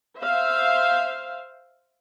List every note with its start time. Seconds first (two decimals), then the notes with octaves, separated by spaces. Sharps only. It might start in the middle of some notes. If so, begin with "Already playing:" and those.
0.19 C5 E5 F5